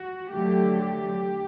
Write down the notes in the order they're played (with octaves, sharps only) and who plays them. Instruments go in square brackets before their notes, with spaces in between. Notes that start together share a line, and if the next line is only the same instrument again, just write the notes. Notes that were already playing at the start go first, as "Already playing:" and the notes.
Already playing: [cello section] F#4
D3 F#3 A3 G4
G4